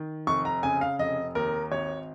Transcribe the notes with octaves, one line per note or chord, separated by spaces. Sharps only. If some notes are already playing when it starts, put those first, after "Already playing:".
Already playing: D#3
F1 C#6
A#5
C#3 G#5
F5
F1 D#5
D#2 A#4
G#1 C#5